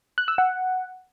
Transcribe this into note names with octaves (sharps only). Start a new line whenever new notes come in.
F#6
E6
F#5